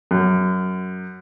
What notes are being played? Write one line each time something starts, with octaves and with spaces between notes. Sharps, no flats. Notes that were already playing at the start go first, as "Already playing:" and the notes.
F#2